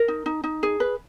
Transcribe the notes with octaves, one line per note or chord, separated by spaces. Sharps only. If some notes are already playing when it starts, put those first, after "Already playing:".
Already playing: A#4
D#4
D#4
D#4
G#4
B4